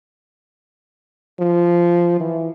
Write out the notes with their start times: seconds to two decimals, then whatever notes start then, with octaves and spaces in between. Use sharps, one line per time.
1.39 F3
2.20 E3